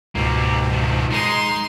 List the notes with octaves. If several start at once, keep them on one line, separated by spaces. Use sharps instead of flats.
C#2 G#2 B2 A#3 G4
D#3 F3
G#3 D#4 C6